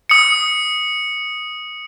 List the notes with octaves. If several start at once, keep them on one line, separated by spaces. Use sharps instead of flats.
D#6 C#7